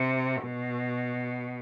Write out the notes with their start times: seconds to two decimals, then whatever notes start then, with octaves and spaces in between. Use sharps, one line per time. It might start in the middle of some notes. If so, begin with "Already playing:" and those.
Already playing: C3
0.43 B2